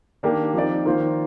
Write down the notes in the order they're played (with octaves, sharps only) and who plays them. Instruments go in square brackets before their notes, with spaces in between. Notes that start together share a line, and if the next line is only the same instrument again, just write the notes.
[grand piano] D#3 A#3 D4 G4 A#4
F3 C4 D#4 A#4 D5
D#3 A#3 F4 C5